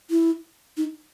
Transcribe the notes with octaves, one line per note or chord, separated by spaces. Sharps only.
E4
D#4